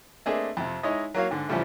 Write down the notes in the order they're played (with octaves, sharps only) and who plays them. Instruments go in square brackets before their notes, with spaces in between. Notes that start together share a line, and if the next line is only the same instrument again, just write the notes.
[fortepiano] A3 A#3 C4 D4 G#4 D#5
F2 C3
G#3 D#4 E4 C#5 D#5
F#3 A#3 C#5 F5
G#2 D3
E2 G#2 C#3 F3 G3 A3